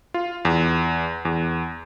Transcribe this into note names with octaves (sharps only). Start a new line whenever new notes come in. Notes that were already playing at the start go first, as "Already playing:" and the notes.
F4
E2
E2